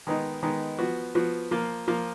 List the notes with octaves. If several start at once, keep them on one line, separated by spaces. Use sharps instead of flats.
D#3 G#3 B3 D#4
D#3 G#3 B3 D#4
F3 B3 F#4
F3 B3 F#4
F3 A#3 F4
F3 A#3 F4